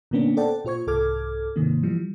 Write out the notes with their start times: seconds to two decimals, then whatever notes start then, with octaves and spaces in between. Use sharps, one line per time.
0.11 A#2 D3 A#3 B3 C#4 D4
0.37 A4 C5 D5 F#5 G5 A5
0.65 A#2 F4 C5 C#6 G#6
0.87 C2 G#2 A4 D6 F6 G#6
1.56 G#2 C3 D#3 A#3
1.83 E3 F3 G3